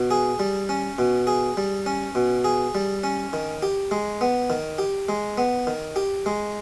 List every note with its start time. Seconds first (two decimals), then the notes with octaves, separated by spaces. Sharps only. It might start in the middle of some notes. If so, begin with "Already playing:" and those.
Already playing: B2
0.11 G#4
0.39 G3
0.69 C#4
0.98 B2
1.27 G#4
1.57 G3
1.86 C#4
2.15 B2
2.44 G#4
2.75 G3
3.04 C#4
3.33 D#3
3.62 G4
3.91 G#3
4.21 B3
4.50 D#3
4.78 G4
5.09 G#3
5.38 B3
5.67 D#3
5.96 G4
6.26 G#3